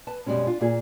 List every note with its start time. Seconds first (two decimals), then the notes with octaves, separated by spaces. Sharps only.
0.07 B4 A5
0.26 F#2 B2 D#3 G3 G#3 C#4
0.47 D4 F4
0.61 A#2 A#3 F4 G#4